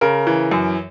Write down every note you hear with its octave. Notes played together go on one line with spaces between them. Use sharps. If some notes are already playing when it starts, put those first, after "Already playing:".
C#3 A#4
E3
F#2